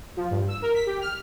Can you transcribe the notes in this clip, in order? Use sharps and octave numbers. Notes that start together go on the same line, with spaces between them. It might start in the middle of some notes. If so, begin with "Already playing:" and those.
F3
G2
E6
A#4
B6
G4
F6